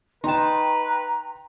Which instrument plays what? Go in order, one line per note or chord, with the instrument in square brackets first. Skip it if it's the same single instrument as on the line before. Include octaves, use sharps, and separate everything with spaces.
[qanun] D#4 A5 [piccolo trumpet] B4 [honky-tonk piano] G5 C6 [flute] A#5